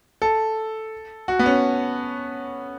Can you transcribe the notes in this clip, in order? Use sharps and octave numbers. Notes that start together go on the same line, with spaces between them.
A4
F#4
B3
C#4